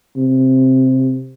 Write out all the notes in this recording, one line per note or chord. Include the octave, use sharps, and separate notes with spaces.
C3